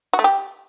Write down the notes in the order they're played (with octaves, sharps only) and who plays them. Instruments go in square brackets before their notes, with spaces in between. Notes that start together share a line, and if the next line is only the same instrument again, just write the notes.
[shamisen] F#4
A3
G4